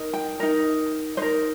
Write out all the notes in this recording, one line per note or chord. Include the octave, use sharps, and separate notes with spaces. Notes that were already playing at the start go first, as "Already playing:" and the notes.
Already playing: D#4 A#4
G5
D#4 A#4
D#4 A#4 C5